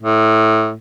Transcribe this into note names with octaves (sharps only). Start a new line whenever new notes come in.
A2